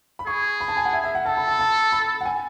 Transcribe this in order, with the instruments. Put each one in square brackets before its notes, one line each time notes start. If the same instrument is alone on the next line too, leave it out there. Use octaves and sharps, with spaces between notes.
[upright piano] B5
[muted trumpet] G#4 [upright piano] C#6
[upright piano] B5
A5
G#5
F#5
E5
E5
F#5
[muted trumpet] A4 [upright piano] A5
[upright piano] B5
A5
A5
B5
F#5
G#5